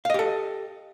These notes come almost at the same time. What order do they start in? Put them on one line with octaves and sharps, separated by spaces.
F5 D#5 G4 A4